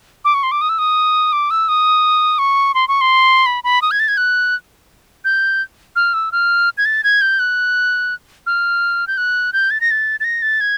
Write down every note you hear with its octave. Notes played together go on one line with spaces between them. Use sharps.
D6
C#6
C6
D6
D#6
E6
D#6
D6
E6
D#6
C#6
C6
C#6
C6
B5
B5
D#6
G#6
A6
G#6
F#6
G6
F6
E6
F6
G#6
A6
G#6
G6
F#6
F6
G6
F#6
G6
A6
A#6
A6
A6
A#6
A6
G#6